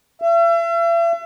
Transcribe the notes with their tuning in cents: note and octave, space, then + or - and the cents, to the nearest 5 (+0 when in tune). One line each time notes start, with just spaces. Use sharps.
E5 +40